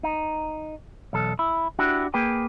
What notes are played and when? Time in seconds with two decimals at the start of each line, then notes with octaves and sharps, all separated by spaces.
0.03 D#4
1.13 B1 E2 A4
1.39 E4
1.79 D4 E4 F#4 G4
2.14 A#3 G#4 B4 G5